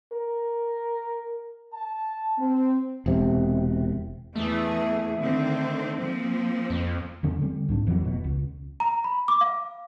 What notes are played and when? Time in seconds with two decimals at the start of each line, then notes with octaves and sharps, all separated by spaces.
0.12 A#4
1.73 A5
2.38 C4
3.06 E1 C3
4.35 E2 E3 A3 G#4
5.20 D3 D#3 C4
5.99 F3 A#3 C4
6.70 F2
7.23 E2 D3 C#4
7.42 D3 G3 C4
7.69 C2 G#2 D4
7.87 F2 E3 F#3
8.04 F1 B2
8.24 C#2
8.80 A#5
9.04 B5
9.28 D6
9.41 F5